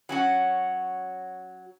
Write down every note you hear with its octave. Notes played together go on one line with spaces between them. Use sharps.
F#3 C#4 F#4